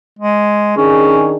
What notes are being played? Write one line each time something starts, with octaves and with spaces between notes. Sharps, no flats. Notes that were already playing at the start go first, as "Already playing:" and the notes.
G#3
D#3 C#4 D4 G#4